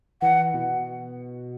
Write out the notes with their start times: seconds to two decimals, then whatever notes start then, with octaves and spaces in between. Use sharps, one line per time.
0.22 E3 F#5
0.54 B2